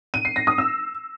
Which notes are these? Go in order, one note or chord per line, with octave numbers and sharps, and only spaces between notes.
D#7
C7
A#6
D#6
E6